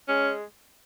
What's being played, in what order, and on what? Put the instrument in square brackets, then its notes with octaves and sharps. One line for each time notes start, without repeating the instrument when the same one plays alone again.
[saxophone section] G#3 C#4